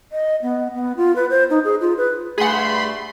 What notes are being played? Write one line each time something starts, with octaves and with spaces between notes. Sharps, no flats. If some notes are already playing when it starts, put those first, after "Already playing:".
D#5
B3
B3
F4
B4
C5
D#4
G#4
F4
B4
G2 A3 G#4 F#5 B5 C6